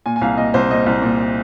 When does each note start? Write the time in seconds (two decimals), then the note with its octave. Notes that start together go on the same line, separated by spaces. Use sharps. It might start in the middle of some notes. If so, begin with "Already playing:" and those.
0.06 A#2 G#5
0.16 G#5
0.21 C2 F5
0.37 A#2 D#5
0.54 C2 C5
0.71 A#2 D#5
0.86 C2
1.02 A#2